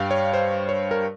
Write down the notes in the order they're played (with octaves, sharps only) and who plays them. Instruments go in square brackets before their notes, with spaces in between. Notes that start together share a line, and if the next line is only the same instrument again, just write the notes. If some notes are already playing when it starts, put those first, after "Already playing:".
Already playing: [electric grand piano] G2 G3 F5 G5
C#5
C5
C#5
A#4